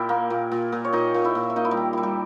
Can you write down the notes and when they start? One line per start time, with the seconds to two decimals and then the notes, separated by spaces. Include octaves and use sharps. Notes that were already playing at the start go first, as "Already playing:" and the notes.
Already playing: A#2 E4 G4 G5
0.09 A#3
0.30 A#2
0.52 A#2
0.72 A#2
0.85 C#5
0.93 A#2 D#4 D#5
1.14 A#2
1.24 E4 E5
1.35 A#2
1.50 E5
1.56 A#3 D#4 D#5
1.65 E4
1.71 G3 G4
1.77 D#3
1.93 G3 E4
2.03 G3 G4